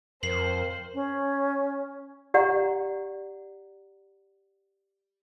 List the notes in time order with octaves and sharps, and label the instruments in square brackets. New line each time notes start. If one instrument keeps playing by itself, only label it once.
[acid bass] F2 [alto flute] A#4 [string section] C5 [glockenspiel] C7 F#7
[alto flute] C#4
[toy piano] G4 D5 F#5 A#5